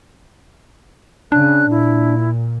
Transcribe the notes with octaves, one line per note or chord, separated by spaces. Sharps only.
C#3 D4 F#6
A#2 E4